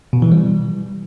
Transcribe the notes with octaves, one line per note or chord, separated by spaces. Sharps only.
B2
E3
G3